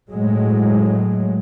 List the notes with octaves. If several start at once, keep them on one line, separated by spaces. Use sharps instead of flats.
A2 F#3 G#3